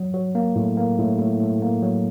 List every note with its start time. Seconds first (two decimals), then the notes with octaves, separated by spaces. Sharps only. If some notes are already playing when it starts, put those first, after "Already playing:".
Already playing: F#3
0.14 F#3
0.35 A#3
0.56 A2
0.77 A#3
0.99 A2
1.19 A2
1.40 A2
1.62 A#3
1.82 F#3